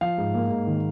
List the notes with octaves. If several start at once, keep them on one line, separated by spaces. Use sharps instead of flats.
F3 F5
G#2
A#3
G#2
D#3